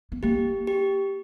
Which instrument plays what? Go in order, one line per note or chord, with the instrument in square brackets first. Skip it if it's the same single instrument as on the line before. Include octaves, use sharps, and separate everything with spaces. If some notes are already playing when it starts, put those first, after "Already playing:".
[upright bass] B3
[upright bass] A#3 [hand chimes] G4
[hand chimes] G4